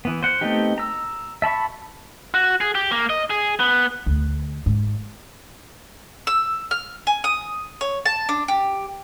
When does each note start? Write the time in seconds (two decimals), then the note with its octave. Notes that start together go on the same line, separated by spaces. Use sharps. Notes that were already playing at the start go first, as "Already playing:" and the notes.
0.05 E3 B3
0.23 C5 F#5
0.41 A3 B3 C4 D#4 G4
0.78 A#5 E6
1.42 E5 A5 B5 C#6
2.34 F#4
2.61 G#4
2.75 G4
2.91 A#3
3.10 D#5
3.30 G#4
3.60 B3
4.06 D2
4.66 G#2
6.27 E6
6.71 F6
7.07 G#5
7.24 D#6
7.81 C#5
8.06 A5
8.29 D4
8.48 G4